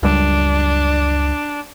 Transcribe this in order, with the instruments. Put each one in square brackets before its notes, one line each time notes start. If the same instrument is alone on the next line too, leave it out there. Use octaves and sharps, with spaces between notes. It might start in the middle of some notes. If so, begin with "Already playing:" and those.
[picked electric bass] C#2 F#2 G3 [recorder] D4